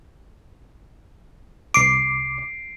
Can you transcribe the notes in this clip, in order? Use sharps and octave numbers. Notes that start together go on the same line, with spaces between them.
C2 D6 C7 D7